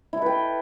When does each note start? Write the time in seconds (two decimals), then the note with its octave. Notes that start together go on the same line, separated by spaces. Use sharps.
0.13 E4
0.17 A4
0.22 B4
0.26 G5